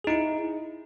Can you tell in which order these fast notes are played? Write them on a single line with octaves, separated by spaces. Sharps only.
G#4 D#4 E4